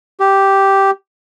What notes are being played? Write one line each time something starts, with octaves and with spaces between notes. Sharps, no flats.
G4